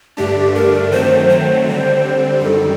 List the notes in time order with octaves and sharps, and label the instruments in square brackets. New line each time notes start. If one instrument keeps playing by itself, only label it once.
[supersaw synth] G2 D3 A3 D4 [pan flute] G4
[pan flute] A#4
[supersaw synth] D#3 F#3 A3 C4 [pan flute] C5
[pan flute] C5
[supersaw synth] D3 G3 C4
[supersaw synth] F#2 D#3 G3 [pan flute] A4